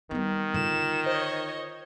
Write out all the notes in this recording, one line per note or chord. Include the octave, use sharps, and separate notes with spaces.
D#3 G3 B3
D3 F4 E7
C5 C#5 D#5